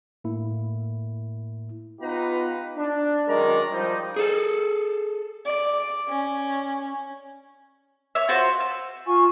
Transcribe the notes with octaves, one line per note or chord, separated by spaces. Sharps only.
A2 A#3 E4
B3 D#4 F4 G4 B4 A#5
D4
F#2 D#3 G#3 A#4 D5 A#5
F3 G3 D#4
G#4 A4
D5
C#4
C#5 E5
F4 F#4 C5
E6
F4 G#5 C#6